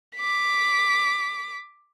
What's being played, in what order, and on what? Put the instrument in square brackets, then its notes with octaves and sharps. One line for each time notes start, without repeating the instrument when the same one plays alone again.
[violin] D6 B6